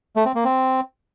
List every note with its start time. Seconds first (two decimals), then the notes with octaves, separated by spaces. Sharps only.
0.16 A3
0.25 C4
0.35 A#3
0.44 C4